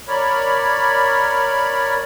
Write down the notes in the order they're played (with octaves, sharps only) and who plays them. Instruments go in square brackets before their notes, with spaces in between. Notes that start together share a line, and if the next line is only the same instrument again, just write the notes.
[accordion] A#4 C#5 D5 B5